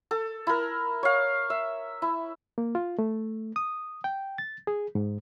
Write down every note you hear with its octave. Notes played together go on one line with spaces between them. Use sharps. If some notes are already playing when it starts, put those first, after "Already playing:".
A4
E4 A#4
C#5 F5
E5
E4
A#3
F4
A3
D#6
G5
A6
G#4
G#2